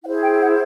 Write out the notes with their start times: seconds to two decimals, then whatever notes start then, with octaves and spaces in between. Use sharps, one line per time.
0.04 E4 G#4 C5 F#5
0.21 G5
0.40 F#5